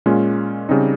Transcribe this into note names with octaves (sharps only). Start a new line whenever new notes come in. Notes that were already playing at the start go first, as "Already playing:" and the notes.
A#2 G#3 C#4 F4
C#3 G3 C4 D#4